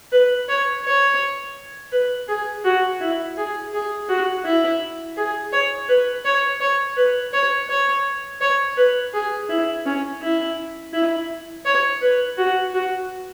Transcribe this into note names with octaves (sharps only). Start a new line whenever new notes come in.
B4
C#5
C#5
B4
G#4
F#4
E4
G#4
G#4
F#4
E4
G#4
C#5
B4
C#5
C#5
B4
C#5
C#5
C#5
B4
G#4
E4
C#4
E4
E4
C#5
B4
F#4
F#4